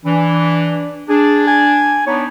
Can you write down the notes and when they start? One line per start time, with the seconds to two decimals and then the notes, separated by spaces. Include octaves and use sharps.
0.05 E3 D4
1.09 D4 G#4
1.48 G#5
2.07 B3 D4 D#4 C#5